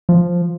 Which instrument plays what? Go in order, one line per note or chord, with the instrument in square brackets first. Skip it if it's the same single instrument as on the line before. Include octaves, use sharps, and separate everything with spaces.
[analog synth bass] F3